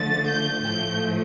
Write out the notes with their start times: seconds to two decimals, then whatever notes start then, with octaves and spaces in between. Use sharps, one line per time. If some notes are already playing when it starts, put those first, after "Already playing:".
Already playing: D3 F3 A3 A6
0.27 G6
0.62 A2 F3 A3 G6